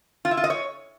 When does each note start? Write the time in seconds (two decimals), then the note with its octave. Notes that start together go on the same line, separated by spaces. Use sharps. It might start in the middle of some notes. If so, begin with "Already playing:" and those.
0.25 F4
0.31 E4
0.37 F4
0.44 D#5
0.50 C#5